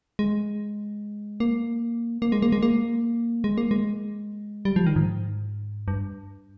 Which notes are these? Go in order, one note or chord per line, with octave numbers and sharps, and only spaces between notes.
G#3
A#3
A#3
G#3
A#3
G#3
A#3
G#3
A#3
G#3
G3
F3
D#3
G#2
G2